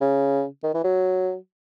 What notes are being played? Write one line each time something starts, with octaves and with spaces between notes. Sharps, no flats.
C#3
D#3
E3
F#3